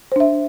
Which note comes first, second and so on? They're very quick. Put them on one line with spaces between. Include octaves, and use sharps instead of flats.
C5 D4 E5